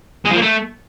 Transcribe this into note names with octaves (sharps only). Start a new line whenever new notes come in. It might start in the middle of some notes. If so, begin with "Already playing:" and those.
G#3
F3
A#3
A3